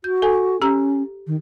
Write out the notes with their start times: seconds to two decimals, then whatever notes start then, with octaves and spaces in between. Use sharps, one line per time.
0.04 F#4 G6
0.22 A4 G#5
0.62 C#4 G4 A#5 E6
1.27 D#3